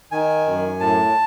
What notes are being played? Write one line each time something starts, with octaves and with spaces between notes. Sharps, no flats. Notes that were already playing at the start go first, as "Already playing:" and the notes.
D#3 G#5
F#2
A2 A5